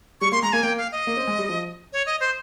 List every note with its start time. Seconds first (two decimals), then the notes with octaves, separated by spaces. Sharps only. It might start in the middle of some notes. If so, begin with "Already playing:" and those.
0.21 G3 C#6
0.32 A#3 C6
0.42 G#3 A#5
0.53 A#3 G#5
0.63 A#3 G5
0.78 F5
0.92 D#5
1.07 A#3
1.17 C4
1.27 G#3
1.39 G3
1.49 F3
1.93 C#5
2.06 D#5
2.20 C5